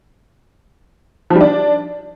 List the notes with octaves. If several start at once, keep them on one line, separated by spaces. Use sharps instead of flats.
F3
G3
D4